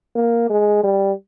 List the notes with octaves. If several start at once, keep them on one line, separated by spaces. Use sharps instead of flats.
A#3
G#3
G3